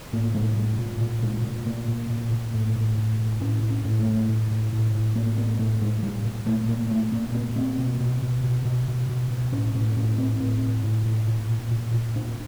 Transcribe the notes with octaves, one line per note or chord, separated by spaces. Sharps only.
A2 A#3
A2 G#3
A2 G3
A#2
A#2
A#2 G#3
A#2
A#2 A#3
A#2
A#2
A#2
A2
A2
A2
A2
A2 C#4
A2
C#4
A2
A3
A2
A2
A2
A2
A2
A2 A#3
A2 B3
A2 A3
A2 G#3
A#2 G3
A#2
A#2 A3
A#2 A#3
A#2 A3
A#2 A#3
A#2 B3
A#2 C4
B2
B2
B2
B2
B2
B2
B2
B2
A2 C#4
A2 C#4
A2 C#4
A2 C4
A2 C4
A2
A2
A2
A#2
A#2
A#2
A#2
A#2 D4